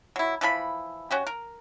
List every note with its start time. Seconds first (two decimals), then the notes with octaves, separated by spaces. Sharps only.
0.16 F#3 E4
0.41 E3 F3 A4 B5
1.11 C#4 F#4 G4
1.27 A#4